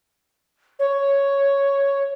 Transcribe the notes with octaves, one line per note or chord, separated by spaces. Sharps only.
C#5